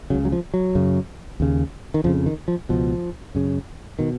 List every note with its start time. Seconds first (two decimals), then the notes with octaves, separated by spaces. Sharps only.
0.10 C#3 F#3
0.14 C#2
0.25 F#3
0.32 F3
0.54 F#3
0.75 F#2 C#3
1.40 D#2 C#3
1.94 D#3
2.04 F2 C#3 F3
2.26 D#3
2.48 F3
2.69 C#2 B2 F3
3.35 F#2 C#3
3.99 B2 D#3